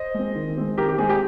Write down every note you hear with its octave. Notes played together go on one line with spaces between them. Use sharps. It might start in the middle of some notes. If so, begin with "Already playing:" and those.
Already playing: C5 D#5
G#3 C4
D#3
G#3 C4
D#3 G4 A#4
G4
G#3 C4 G#4
G4